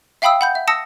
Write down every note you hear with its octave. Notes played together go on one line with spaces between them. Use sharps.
E5 F5 G5 B5 D#6 E6
F#5 B5 G6
E5
A5 D#6 E6 A#6 C#7